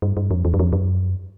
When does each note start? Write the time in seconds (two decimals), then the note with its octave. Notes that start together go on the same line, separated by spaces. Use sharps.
0.02 G2
0.17 G2
0.31 F2
0.45 E2
0.54 F#2
0.59 F2
0.73 F#2